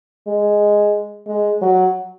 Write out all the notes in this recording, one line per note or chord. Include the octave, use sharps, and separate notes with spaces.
G#3
G#3
F#3